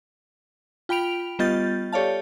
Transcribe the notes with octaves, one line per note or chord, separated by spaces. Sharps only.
F4 G5 B5 D7 F7
G3 B3 F4 D#5 G6 A6
G4 A4 C#5 D5 F5 A5